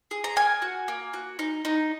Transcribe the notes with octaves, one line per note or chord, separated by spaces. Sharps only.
G#4
A#5
A#3 G#5
F#4
A#3
F#4
D#4
D#4